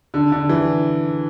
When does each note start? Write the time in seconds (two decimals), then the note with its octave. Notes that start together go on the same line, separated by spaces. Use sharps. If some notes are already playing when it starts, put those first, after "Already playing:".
0.14 D3
0.32 D3
0.49 E3